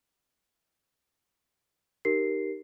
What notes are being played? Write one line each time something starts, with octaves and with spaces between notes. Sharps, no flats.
D#4 G4 A#4 C7